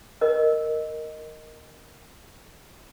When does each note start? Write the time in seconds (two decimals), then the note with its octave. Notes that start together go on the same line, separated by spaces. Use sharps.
0.21 A#4 D#5